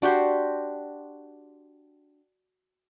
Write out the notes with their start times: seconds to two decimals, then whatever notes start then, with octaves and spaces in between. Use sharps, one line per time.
0.02 D4 F#4 G4 C5